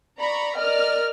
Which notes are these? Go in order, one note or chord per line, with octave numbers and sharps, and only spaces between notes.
D5 A#5 B5 C#6
A#4 D5 D#5 F6